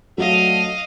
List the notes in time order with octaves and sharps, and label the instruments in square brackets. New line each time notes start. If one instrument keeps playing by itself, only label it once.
[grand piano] F#3 [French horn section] A3 D4 F#4 [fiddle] D#5 F5